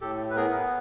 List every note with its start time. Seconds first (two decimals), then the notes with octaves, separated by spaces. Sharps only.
0.01 A2 G4 A4
0.30 B4
0.36 B3 G#4 A#4